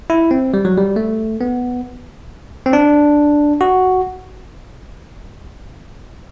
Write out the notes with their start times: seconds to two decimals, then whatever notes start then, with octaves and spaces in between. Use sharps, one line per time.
0.10 E4
0.31 C4
0.54 G3
0.65 F#3
0.78 G3
0.96 A3
1.41 B3
2.66 C4
2.73 D4
3.61 F#4